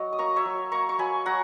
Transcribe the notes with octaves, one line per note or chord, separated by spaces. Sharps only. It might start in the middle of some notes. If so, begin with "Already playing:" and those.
Already playing: F#3 D#5
D#6
A#3 A#5 C#6
C#5 E5
F#3
A#3 A#5 C#6
C#6
F#3 G#5 B5
F#3 F#5 A#5